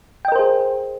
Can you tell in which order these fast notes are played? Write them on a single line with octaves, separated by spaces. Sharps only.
G5 D#5 A#4 C5 G#4